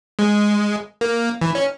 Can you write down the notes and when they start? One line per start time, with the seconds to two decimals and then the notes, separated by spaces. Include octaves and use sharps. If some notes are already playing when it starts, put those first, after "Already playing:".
0.19 G#3
1.01 A#3
1.41 E3
1.55 C#4